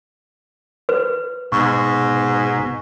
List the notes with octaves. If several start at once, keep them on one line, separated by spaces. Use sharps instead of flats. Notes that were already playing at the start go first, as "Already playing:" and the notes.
B4
G#2 B2 C#6